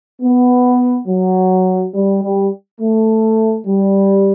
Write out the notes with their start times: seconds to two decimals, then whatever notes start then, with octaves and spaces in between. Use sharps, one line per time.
0.21 B3
1.08 F#3
1.94 G3
2.22 G3
2.80 A3
3.66 G3